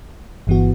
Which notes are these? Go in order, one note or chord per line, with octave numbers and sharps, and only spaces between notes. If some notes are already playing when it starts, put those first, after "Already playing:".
G1 G2 E3 B3 F#4